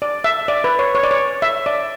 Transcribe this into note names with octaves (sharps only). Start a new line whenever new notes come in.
D5
E5
D5
B4
C#5
C#5
D5
C#5
E5
D5